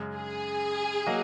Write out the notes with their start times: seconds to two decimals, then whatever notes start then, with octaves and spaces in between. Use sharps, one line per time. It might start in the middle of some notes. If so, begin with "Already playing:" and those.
Already playing: F#2 C#3 G#3
0.15 G#4
1.07 F#3 A#3 F#4 D#5